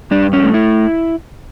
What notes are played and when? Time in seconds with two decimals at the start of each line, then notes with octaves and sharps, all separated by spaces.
0.11 G2 D4
0.33 C#4
0.44 A3
0.54 E4